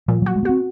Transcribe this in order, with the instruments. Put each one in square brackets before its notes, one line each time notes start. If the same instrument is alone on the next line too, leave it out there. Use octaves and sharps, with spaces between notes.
[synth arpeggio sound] A#2 [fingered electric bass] F3
[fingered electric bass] F#3 [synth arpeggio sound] F#4
[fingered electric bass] G#3
A#3
[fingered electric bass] C4 [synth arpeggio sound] F#4